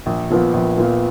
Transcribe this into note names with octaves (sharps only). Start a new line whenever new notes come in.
A#1
A#2 F3 B3 F4
A#1
A#2 F3 B3 F4